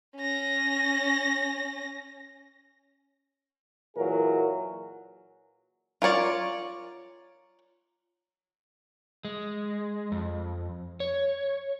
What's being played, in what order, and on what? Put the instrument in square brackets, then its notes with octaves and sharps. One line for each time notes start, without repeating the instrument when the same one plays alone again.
[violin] C#4 A#6
[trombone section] A#2 E3 F#3 G#4 A#4
[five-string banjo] F4 A#4 C#5 D5
[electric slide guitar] G#3
F2
C#5